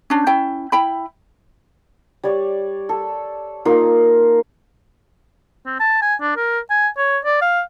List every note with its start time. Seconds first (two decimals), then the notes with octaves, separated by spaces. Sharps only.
0.10 C#4 D4
0.26 C#4 E4 G5
0.72 E4 G5 B5
2.23 G3 C#5 D5
2.89 A4
3.65 A#3 D#4 F4 A#4
5.66 C4
5.79 A5
6.02 G#5
6.21 D4
6.36 A#4
6.70 G#5
6.97 C#5
7.25 D5
7.42 F5